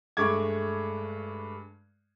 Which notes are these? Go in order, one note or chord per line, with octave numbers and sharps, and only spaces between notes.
G2 G#3 A3 C#6 D6 G#6